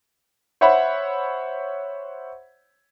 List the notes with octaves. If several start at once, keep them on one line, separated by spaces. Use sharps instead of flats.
C5 C#5 E5 F#5 B5